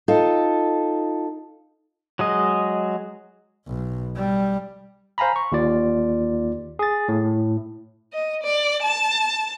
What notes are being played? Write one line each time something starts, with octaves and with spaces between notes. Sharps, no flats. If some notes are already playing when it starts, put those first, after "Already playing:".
D#4 F4 A4
F#3 G#3 D#5
B1
G3
C5 F5 G#5 A#5 B5
C#6
D#2 F4 D5
G#4 A6
A2
D#5
D5
A5